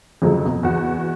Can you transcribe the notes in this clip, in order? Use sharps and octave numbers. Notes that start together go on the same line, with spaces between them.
F2 C#3 F3 F#3 G#3 A3
B2
E2 F#4